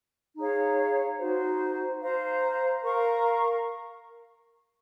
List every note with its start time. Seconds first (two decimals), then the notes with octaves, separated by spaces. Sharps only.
0.36 D#4 G#4 C#5 F5
1.18 D#4 F#4 C5
2.01 C5 F5 A#5
2.83 A#4 F5 A#5 C#6